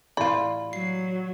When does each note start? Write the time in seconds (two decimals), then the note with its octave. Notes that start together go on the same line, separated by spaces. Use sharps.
0.17 A2 E3 E4 F4 G4 D5 B5
0.73 F#3 C7